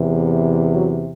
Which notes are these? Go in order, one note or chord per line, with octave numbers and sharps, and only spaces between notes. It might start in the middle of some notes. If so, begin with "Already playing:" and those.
Already playing: E2 C3 E3
F#3 F#4